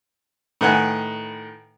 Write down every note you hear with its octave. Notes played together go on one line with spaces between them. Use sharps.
A2 D#3 B4 F#5 G#5